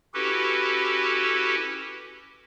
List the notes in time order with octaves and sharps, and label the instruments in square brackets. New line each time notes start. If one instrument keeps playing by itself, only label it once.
[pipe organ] C#4 E4 F#4 G4 A4 B4